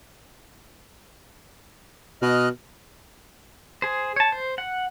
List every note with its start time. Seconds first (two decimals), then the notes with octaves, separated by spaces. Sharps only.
2.22 B2 D#5 F6 F#6
3.82 G#4 C5
4.16 C#5 A5
4.32 C5
4.58 F#5